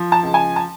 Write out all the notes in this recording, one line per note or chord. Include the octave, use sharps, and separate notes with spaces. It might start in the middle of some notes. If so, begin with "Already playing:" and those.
Already playing: F3
A5
C#2
G#5
A5